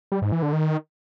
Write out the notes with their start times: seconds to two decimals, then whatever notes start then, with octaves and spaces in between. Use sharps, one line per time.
0.12 G3
0.22 G#2
0.32 E3
0.42 D3
0.53 D#3